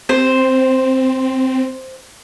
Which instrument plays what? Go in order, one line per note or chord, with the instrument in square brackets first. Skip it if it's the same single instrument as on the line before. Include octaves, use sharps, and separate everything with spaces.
[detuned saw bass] C4 [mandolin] C5